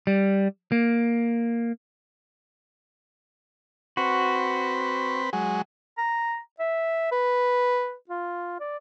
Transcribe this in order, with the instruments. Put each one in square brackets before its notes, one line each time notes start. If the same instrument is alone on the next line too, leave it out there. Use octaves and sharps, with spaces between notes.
[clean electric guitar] G3
A#3
[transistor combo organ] C4 B4 [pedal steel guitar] F#4
[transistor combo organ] F#3 G#3
[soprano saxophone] A#5
E5
B4
F4
D5